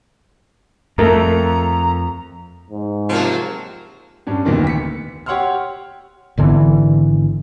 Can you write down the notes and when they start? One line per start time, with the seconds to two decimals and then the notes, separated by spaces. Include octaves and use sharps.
0.98 F2 A3 A#4 A#5
2.70 G#2
3.09 C3 F3 F#3 A#3
4.27 G2 C#4 D4
4.45 F1 D2 A#2 D#3 B3
4.67 B6 C#7
5.26 G4 C#5 F#5 C6 E6 F6
6.37 G#1 D3 E3 B3